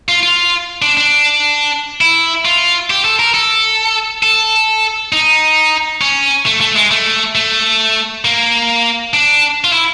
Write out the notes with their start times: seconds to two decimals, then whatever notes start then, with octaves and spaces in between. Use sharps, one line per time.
0.09 F4
0.23 F4
0.82 D4
0.97 D4
2.01 E4
2.45 F4
2.90 G4
3.05 A4
3.19 A#4
3.34 A4
4.23 A4
5.12 D#4
6.01 C#4
6.46 A3
6.61 A3
6.76 G#3
6.91 A3
7.35 A3
8.25 A#3
9.14 D4
9.64 F4
9.72 E4